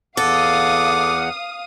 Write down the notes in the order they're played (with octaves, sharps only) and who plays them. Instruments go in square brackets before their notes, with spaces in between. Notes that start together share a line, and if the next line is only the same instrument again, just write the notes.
[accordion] E2 F#5 [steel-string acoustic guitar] A4 [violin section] F5 D#6 [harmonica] D6